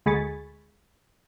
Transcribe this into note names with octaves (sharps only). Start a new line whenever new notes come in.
D2 G#3 G#5 B5 C#6 A6